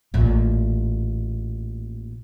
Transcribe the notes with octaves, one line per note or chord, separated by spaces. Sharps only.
A1 A#2